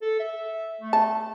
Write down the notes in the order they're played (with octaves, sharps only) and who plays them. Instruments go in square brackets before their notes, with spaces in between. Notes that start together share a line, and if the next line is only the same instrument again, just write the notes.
[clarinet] A4
E5
A3
[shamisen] A5